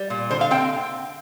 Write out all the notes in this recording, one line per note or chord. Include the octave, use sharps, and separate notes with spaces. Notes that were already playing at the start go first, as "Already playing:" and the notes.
Already playing: G3
A#2
D3 C5
F5
C4 G5